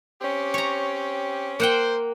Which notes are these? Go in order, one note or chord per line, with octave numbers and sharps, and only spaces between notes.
C4 C#4 G4
C#5 A#5
A#3 C5 F#5 G5